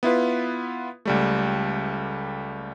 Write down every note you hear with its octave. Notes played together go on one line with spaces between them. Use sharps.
B3 E4 F4 B4
C#2 G3 A3